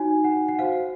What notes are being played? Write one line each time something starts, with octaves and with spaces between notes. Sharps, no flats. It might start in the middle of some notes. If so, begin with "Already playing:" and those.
Already playing: D#4 F#4 C#5 G#5
F#5
F#5
F#4 C5 F5